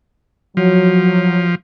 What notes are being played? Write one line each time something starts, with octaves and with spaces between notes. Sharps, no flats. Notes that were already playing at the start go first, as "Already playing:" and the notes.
F3 F#3